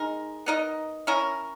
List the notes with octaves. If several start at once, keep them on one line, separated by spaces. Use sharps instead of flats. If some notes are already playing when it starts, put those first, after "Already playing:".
Already playing: G#3 D#4 A#4
B3 D#4 A#4 D#5
C#4 E4 A#4